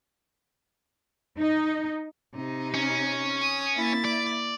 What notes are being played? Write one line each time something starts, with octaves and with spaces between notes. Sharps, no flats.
D#4
C3 D#4
C#4
D#6
A#3 E4 A6
D5